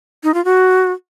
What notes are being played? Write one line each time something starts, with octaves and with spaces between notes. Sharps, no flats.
D#4
F4
F#4